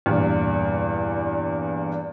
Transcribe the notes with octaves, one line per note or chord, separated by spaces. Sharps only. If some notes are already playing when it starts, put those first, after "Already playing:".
E2 G2 A#2